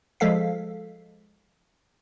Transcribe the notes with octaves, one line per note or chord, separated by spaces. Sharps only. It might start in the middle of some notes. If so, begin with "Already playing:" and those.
F3 G#3 A4 F5 B6